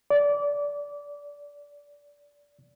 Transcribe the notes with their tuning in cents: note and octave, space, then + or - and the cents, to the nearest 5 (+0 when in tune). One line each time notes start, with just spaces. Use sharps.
D5 -20